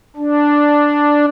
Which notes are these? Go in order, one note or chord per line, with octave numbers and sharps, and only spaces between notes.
D4